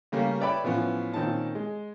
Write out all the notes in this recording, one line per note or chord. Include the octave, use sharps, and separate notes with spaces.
C#3 G3 A3 A#3 C#4
B4 C#5 D5 E5 G5 B5
A2 E3 F3 B3 C#4
A#2 D#3 C4 C#4 A5
G#3